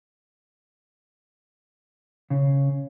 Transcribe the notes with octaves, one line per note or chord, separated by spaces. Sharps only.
C#3